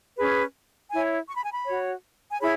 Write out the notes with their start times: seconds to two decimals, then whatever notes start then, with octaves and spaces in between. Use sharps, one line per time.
0.17 C#4 G#4 B4
0.90 E4 C#5 G#5
1.28 C#6
1.37 B5
1.45 G#5
1.53 B5
1.65 F#4 C#5
2.32 G#5
2.40 E4 G#4 C#5 B5